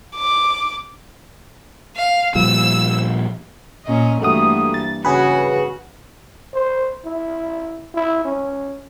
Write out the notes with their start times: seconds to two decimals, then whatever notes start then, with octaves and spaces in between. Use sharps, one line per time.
0.16 D6
1.96 F5
2.35 A#2 F3 G3 E6
3.86 A#2 C#4 D#5
4.22 G2 E3 A3 A#3 F#4 D#6
4.74 A6
5.05 C#3 C#4 F#4 G#4 B4
6.54 C5
7.05 E4
7.94 E4
8.25 C#4